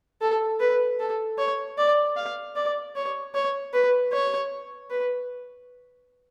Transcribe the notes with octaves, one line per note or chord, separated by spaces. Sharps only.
A4
B4
A4
C#5
D5
F5
D5
C#5
C#5
B4
C#5
B4